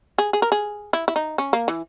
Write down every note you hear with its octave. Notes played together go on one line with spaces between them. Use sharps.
G#4
G#4
A#4
G#4
E4
E4
D#4
C#4
A#3
E3